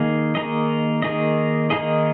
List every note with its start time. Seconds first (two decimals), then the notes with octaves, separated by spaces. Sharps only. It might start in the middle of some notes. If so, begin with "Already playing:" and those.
Already playing: D#3 A#3 D#4 G#4 D#5
0.35 D#3 A#3 D#4 G#4 D#5
1.02 D#3 A#3 D#4 G#4 D#5
1.70 D#3 A#3 D#4 G#4 D#5